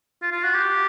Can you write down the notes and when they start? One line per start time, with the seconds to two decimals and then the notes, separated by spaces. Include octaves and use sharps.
0.22 F4
0.32 F4
0.44 F#4
0.54 G4